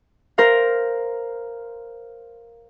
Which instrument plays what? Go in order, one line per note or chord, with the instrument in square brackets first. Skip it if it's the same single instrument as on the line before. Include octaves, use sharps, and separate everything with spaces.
[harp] A#4 C5 F5